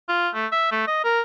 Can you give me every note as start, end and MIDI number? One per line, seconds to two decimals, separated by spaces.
0.09 0.29 65
0.34 0.47 57
0.52 0.68 76
0.71 0.83 57
0.87 1.04 75
1.04 1.21 70